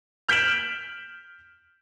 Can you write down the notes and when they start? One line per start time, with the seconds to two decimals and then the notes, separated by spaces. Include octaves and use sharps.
0.29 F6 G6 B6 D7 E7 F#7